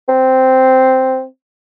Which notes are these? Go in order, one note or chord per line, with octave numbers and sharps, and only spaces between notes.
C4